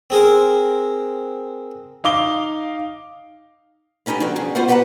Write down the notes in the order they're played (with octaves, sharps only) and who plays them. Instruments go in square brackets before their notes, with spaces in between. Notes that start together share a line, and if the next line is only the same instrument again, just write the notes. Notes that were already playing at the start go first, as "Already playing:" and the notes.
[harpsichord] C4 G#4 A#4 C5
[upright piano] D#4 F5 D6 G7
[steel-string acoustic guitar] B3 C#4 D#4 E4 G4
D3 F3 F#4 G5
G3 C#4 G#4
B3 F4 F#4 C5 F5 F#5
D2 G4 B4 F#5 A5 A#5